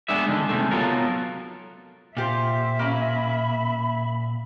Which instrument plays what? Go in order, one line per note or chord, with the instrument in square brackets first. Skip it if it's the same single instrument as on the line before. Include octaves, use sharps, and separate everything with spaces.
[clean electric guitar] G#3 B3 D4 G#4 E5
D3 D#3 G#3
C3 G#3 A3
F#3 B3 F4 A4 A#4
[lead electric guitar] A#2 [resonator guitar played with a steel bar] F4 G4 C5 [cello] E5
[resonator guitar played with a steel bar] A#3 C#4 [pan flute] B5